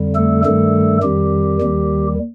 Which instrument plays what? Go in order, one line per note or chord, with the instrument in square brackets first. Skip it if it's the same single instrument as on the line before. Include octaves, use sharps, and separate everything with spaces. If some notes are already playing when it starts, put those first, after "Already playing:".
Already playing: [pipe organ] F2 D3 G3
A3 A4
G2 D#3 G3 A3 A4
F2 D#3 G3 G4
D#2 D#3 G3